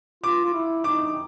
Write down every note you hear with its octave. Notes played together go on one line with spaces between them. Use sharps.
F4 D6
F4
E4
D#4 D6